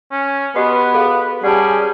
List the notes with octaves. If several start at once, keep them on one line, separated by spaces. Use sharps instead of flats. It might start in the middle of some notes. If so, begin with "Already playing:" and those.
C#4
B3 F#4 G4 B4 D#5
G#4 A4 F5
G3 C#4 G#4 F#5 G#5 A5